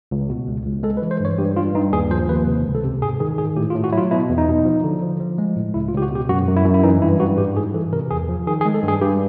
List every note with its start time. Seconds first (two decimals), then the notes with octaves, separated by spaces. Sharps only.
0.11 C#2
0.29 B2
0.48 C#2
0.66 C#2
0.83 G#3 A4
0.97 B4
1.02 E3
1.11 C5
1.20 G2 C#5
1.38 G2 G4
1.56 G2 F4
1.75 G2 D#4
1.93 D#2 G#4
2.11 F3 C5
2.29 D#2 B4
2.47 C3
2.65 C#2
2.75 A4
2.84 C3
3.02 G#2 G#4
3.20 D#3 G#4
3.38 G#2 G#4
3.56 A2 G4
3.70 F4
3.75 A2
3.84 F#4
3.93 F#3 E4
3.97 F4
4.11 B2 E4
4.29 E2
4.38 D#4
4.48 B2
4.65 F3
4.84 D3
5.02 F3
5.20 F3
5.38 G#3
5.56 A2
5.74 C#2 E4
5.88 F4
5.93 C#2 G4
6.02 F#4
6.11 B2 G4
6.29 F#2 F#4
6.47 F#2
6.56 E4
6.65 F#2
6.74 E4
6.83 E3 D#4
7.02 G2 E4
7.20 G2 F#4
7.38 G#2 G4
7.56 G#2 G#4
7.74 E3 A4
7.93 C3 A#4
8.11 E2 G#4
8.29 F3
8.47 D#3 G#4
8.61 G#4
8.65 G#3
8.74 A4
8.84 G2 G#4
9.02 G2 G4